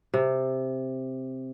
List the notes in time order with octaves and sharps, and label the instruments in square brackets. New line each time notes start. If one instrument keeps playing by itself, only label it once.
[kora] C3